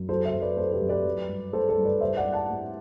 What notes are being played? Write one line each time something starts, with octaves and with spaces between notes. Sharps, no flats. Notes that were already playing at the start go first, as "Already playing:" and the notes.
Already playing: F#2
F#3 A4 C5
C5 E5
F#2
B4 D5
A3 A4 C5
G4 B4
F#2
B4 D5
F#3
G2
A3 A4 C5
A4 C5
G2
B4 D5
G3 C5 E5
D5 F#5
G3
F#5 A5
A2